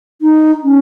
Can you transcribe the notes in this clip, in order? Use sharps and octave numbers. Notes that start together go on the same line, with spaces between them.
D#4
C#4